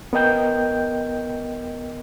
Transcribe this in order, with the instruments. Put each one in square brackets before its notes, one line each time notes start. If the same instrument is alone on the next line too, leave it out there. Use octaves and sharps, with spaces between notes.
[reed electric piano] B3 A#4 D#5 G5 G6